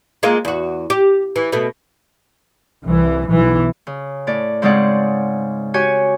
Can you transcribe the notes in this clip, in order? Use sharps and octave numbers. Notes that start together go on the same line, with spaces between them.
G#3 A#3 F4
E2 F#4
G4
E3
B2 A3
C2 E3
B1 E3
C#3
A2 D5
G#2 C#3 G#3 C4 D5 F#5
F#4 G4 C#5 G#5